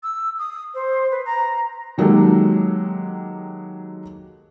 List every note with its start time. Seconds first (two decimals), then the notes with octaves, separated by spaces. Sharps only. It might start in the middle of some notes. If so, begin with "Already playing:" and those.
0.03 E6
0.39 D#6
0.74 C5
1.11 B4
1.25 A#5
1.98 D#3 F#3 G#3 A#3 G4 A4